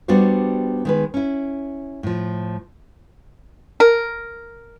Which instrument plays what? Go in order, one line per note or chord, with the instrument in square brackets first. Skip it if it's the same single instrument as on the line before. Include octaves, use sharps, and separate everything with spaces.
[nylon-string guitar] G3 B3 D4 F#4 G4 C5
D#3 G#3 B4
C#4 E4
A2 F3
[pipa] A#4